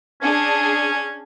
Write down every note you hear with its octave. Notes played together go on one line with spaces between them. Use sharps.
C#4 D4 G#4